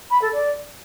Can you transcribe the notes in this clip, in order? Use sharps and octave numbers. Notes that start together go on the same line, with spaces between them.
B5
A4
D5